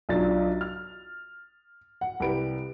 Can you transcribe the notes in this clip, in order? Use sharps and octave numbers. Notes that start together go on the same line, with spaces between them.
B1 F#3 D4 F4 A6
F6
F#5
C2 G4 B4 D7